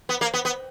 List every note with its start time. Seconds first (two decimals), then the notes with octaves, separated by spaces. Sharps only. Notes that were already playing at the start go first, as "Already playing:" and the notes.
0.09 B3
0.21 A#3
0.34 B3
0.45 B3